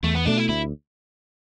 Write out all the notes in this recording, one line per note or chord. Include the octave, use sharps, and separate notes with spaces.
E2 A3
B3
B2 A3 D4
E4
D2 E4